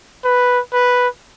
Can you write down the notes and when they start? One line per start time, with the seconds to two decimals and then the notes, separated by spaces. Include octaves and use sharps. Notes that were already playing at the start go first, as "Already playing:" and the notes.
0.24 B4
0.73 B4